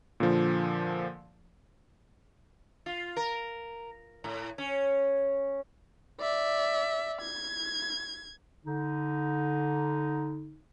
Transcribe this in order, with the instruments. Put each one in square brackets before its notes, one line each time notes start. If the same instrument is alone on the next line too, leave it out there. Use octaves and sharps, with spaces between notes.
[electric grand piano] A#2 D3 F3
[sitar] F4
A#4
A2
C#4
[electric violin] D5 E5
G#6
[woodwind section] D3 D#4